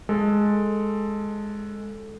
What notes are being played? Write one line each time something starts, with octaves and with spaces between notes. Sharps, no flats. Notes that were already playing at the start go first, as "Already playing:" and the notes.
G#3 A4